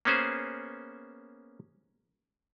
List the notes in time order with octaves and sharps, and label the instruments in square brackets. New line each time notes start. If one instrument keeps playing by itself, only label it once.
[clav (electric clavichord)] A#3 B3 C#4 G#4 C5